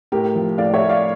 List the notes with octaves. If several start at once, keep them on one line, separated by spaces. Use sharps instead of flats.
A2 G4 A#4
F3
A2 D5 F5
C#5 E5
A3
D5 F5